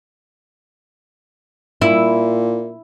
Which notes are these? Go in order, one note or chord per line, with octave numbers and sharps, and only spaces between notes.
A#2 E4